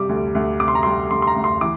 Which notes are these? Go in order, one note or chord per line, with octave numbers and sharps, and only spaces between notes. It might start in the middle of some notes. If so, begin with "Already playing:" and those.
Already playing: C3 G3 D6
D2
D2
C3 D6
C6
A#5
G3 C6
D2 C6
C6
A#5
D2
C6
E3 D6